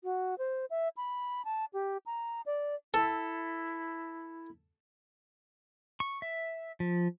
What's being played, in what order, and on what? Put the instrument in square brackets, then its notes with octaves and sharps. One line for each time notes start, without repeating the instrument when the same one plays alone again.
[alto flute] F#4
C5
E5
B5
A5
G4
A#5
D5
[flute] E4 [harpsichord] A4
[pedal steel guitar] C#6
E5
F3